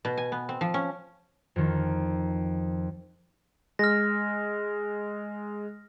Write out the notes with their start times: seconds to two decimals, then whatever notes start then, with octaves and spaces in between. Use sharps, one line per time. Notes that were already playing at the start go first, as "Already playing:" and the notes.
0.05 B2
0.17 G#5
0.32 B3
0.49 C4
0.61 F3
0.74 C#4
1.56 F2 D#3
3.79 G#3 F6 A#6